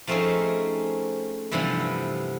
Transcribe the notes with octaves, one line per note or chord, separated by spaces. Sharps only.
F3 A3 C4 C#4 D#4 G#4
G2 C3 E3 F3 G3 B3